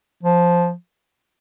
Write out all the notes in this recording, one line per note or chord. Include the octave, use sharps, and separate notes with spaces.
F3